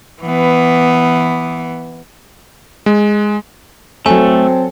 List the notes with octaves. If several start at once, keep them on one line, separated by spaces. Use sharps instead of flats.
E3 B3
G#3
F#3 A3 C4 A4 G#5